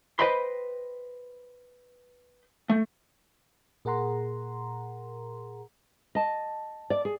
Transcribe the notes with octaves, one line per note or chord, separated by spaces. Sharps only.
B4 C5 D#5 G5 B5 C6
A3
A#2 G#4 A#4 F#5 A#5 C6
D#5 A5
D5
G#4